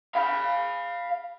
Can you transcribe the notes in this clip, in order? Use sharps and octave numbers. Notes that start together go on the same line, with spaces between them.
F5 B5